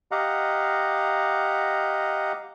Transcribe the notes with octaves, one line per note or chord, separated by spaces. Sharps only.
G4 D#5 F5 F#5 A#5